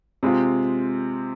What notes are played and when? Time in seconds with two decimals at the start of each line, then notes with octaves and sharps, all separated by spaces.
0.23 C3 G#3 C4 F4